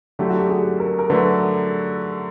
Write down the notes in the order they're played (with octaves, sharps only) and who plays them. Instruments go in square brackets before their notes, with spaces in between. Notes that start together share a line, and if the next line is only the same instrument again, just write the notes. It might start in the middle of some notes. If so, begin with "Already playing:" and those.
[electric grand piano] D3 F#3 A3 [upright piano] G4
[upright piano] F#4
G4
G#4
A#4
A#4
[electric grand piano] D3 F#3 A3 [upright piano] B4